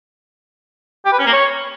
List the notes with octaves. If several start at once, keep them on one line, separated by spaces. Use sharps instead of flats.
G4
B4
C#4
A#3
C#5